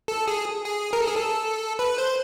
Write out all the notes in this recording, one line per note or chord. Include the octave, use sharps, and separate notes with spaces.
A4
G#4
G#4
A#4
A4
G#4
A4
B4
C5